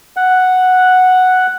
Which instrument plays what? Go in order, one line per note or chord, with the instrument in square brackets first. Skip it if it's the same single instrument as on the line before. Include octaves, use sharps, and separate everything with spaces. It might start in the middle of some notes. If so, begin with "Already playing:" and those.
[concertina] F#5